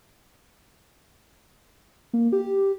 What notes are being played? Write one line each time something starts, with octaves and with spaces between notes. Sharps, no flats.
A#3
G4